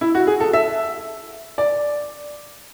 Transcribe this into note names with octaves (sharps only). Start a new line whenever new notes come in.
E4
F#4
G#4
A4
E5
D5